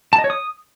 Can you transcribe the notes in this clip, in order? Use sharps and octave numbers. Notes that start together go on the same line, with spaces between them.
A5
D#5
C#5
D#6